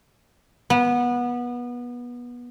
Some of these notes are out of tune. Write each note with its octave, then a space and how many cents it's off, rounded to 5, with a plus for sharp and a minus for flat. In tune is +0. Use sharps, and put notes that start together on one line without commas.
B3 -20